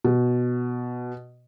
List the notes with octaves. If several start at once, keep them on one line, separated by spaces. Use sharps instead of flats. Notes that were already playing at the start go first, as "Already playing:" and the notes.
B2